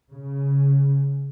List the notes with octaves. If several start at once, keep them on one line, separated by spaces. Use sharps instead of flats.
C#3